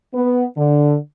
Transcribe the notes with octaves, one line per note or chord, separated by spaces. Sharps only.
B3
D3